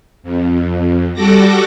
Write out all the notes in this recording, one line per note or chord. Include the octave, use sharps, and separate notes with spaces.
F2
G3 F#4 A4 D6 A#6